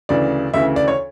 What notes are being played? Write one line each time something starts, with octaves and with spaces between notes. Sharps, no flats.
D2 C#3 E3 D5
D2 C#3 E3 E5
D5
C#5